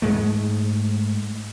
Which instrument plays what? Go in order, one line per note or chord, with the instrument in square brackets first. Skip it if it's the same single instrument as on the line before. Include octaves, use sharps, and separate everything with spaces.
[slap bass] G#2 G#3 A3